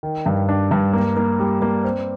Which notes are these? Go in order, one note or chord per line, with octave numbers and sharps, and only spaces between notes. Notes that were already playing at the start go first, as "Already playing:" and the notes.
D#3
G2
D4
G2
A#3
A#3
G3
A#3
C4